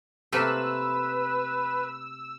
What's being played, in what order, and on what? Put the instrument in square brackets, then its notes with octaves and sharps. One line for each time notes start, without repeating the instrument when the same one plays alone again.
[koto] C3 A3 A#3 [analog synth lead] B4 [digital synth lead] E6